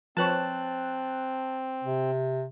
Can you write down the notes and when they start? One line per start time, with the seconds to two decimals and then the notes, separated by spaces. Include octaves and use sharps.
0.17 F3 C4 B4 C#5 A5 F#6
1.84 C3